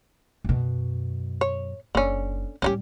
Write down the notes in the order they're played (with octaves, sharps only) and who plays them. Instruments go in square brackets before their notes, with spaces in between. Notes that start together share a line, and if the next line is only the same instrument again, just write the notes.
[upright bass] F#2 B2
[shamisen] C#5
[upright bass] F#1 [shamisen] D3 C#4
[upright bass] A2 G3 [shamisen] C#4 D#4 G4